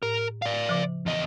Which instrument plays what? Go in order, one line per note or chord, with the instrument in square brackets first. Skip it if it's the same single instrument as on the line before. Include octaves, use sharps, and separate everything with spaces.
[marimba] A2 [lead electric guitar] A#4
[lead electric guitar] D5 F5
[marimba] C#3 F3
[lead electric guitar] E2 D#5